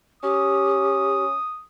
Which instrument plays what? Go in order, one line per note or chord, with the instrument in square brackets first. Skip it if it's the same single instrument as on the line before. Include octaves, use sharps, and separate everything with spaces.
[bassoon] C#4 [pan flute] G4 [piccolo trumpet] D#6